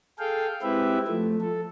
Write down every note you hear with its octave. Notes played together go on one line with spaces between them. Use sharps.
G#4 A4 F5 G5
G#3 C4 E4 G4 B4 E5
F3 A3
A4